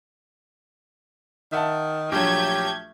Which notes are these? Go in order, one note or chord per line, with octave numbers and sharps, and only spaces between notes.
D#3 E5 F#5 A5
A#1 F#3 A3 G4 G6 G#6